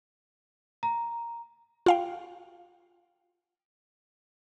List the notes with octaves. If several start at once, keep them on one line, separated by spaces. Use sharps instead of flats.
A#5
F4 F5 G5